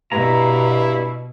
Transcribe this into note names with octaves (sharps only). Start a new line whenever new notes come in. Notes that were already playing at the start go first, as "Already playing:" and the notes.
G2 B2 E4 A#5